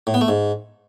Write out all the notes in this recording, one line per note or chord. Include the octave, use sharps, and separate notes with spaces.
A2
B3
A3
G#2